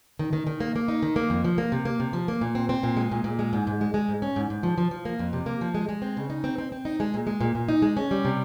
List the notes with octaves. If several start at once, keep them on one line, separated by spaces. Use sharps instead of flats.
D#3
D#3
D#3
A#3
A#3
D#4
D#3
A#3
F2
F3
A#3
C3
A#3
C3
F3
A#3
A#2
C4
C4
A#2
G#3
A#2
A#2
G#3
G#2
G#2
G#3
G#3
G#2
C#4
G#2
G#2
F3
F3
F3
A#3
F2
C3
A#3
F3
G#3
G#3
C4
C#3
D#4
C4
C4
C4
D#4
G#3
A#2
G#3
A#2
A#2
D#4
G#3
C#4
G3
C3